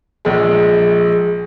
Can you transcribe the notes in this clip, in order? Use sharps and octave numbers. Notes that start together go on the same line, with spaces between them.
A#1 G#3